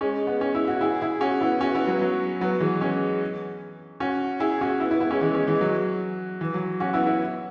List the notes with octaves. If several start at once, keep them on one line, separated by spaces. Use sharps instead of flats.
G#3 C#4
B3
C#4
E4
F#4
E4 G#4
E4 G#4
C#4 F#4
B3 E4
C#4 F#4
B3 E4
F#3 B3
F#3
F#3 B3
E3 G#3
G#3 C#4
C#4 F#4
E4 G#4
C#4 F#4
B3 E4
B3 E4
B3 E4
G#3 C#4
E3 G#3
G#3 C#4
E3 G#3
F#3
E3
F#3
C#4 F#4
B3 E4
B3 E4